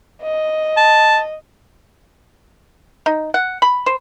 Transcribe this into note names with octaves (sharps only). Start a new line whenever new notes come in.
D#5
A5
D#4
F#5
B5
C5